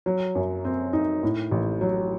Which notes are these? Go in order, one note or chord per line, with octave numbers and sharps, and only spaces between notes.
F#3
F#2
C4
D#4
A2
A1
F#3